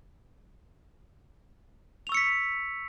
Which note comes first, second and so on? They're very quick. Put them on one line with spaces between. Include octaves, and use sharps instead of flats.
F7 C#6 E6 C#7 B6